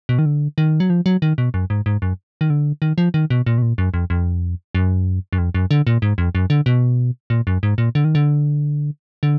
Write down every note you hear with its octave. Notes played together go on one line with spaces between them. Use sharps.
B2
D#3
D3
D#3
F#3
F3
F#3
D#3
B2
F#2
G#2
G#2
F#2
D#3
D3
D#3
F3
D#3
B2
A#2
B2
A#2
F#2
F2
F2
F#2
F#2
F2
F#2
D3
A#2
G#2
F2
F#2
D3
B2
A#2
F#2
G#2
A#2
D3
D#3
D3
D3